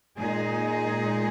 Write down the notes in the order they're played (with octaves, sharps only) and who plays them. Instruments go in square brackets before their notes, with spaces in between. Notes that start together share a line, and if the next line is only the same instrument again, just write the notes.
[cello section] A#2 G#3 D#4 G#4